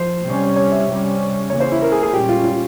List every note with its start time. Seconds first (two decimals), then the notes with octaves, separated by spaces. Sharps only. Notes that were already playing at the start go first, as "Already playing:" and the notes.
Already playing: F3 C5
0.24 C3 G3 C#4
0.56 C#5
0.72 E5
0.88 C3 G3 C#4
1.50 C#3 E3 A#3 C#4 C#5
1.60 C5
1.72 E4
1.82 A#4
1.92 G#4
2.03 G#4
2.13 A#2 G3 C#4 G4
2.29 F4
2.44 F4